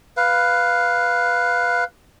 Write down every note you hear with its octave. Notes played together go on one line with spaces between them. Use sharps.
B4 F5